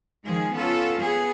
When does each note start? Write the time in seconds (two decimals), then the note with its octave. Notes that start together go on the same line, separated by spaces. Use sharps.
0.25 D#3 F3 G#3 G#4
0.54 B3 C#4 F4 A4
1.00 B3 G#4